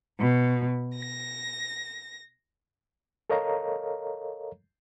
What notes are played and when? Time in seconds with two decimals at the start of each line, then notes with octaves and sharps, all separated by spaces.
0.19 B2
0.95 A#6
3.30 A4 A#4 C#5 D#5 F5 A#5